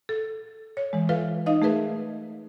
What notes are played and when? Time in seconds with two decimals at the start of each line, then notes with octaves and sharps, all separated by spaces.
0.09 A4
0.77 C#5
0.93 E3 G#3
1.09 F4 A4 B4 E5 F5
1.46 D#4 D#5 F5
1.62 A3 G#4 A#4 B4 E5